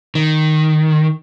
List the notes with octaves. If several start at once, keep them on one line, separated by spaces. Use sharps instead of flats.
D#3